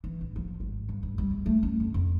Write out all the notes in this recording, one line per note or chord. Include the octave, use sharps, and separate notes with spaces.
E3
A1
F3
G#1
G2
G2
G3
E2
A3
C#4
F2
F2